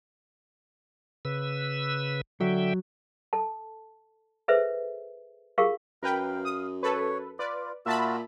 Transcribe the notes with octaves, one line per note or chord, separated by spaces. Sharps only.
C#3 B4 E6
D3 F#3 E5 G5
A4 A5
G#4 A4 B4 C5 E5
F4 G4 G#4 A#4 F5 C#6
F#2 A#4 B4 F5 G5
D#6
A4 B4 C#5
F4 B4 D5
A#2 F4 F#4 E5 A5 B5 E6